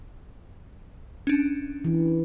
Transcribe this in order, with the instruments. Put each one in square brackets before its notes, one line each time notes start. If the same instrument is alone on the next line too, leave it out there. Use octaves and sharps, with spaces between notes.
[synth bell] C#4 D4
[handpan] E3